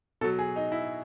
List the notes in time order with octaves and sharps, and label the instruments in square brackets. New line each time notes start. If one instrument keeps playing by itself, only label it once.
[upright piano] B2 A4
F#3
G#4
D#4
E4